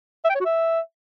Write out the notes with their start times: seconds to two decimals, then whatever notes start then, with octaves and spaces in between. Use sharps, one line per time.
0.25 E5
0.30 G5
0.35 C#5
0.40 F#4
0.45 E5